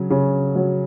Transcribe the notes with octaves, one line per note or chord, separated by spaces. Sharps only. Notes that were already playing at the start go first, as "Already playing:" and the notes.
Already playing: C#3 F#3
C#3
F#3